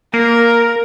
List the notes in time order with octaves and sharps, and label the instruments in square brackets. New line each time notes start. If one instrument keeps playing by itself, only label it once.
[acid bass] A#3 [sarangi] A#4